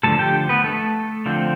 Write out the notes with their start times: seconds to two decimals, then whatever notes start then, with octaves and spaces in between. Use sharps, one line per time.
0.03 D3 F3 A3 A4 A5
0.19 G4 G5
0.49 B3 B4
0.64 A3 A4
1.26 D3 F3 C4